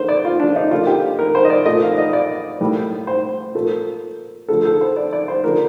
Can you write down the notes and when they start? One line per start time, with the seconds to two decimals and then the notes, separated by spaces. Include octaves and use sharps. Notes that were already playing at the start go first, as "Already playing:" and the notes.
Already playing: D3 A#3 C5
0.09 D5
0.25 F4
0.40 D4
0.56 D#4
0.71 D3 F3 A#3 F4
0.87 G4
1.19 A#4
1.35 C5
1.45 D#5
1.50 D5
1.66 A#2 A3 D#5
1.82 F5
1.98 D#5
2.13 D5
2.60 A2 G3 A#3
3.07 C5
3.55 A#2 A3
4.49 D3 F3 A3 A4
4.65 A4
4.81 C5
4.97 D5
5.13 D5
5.28 C5
5.44 D3 F3 A#3 A#4